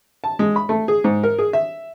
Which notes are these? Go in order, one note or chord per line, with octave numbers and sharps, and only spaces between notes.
A5
G#3
B5
A3
G#4
G#2
A#4
G#4
E5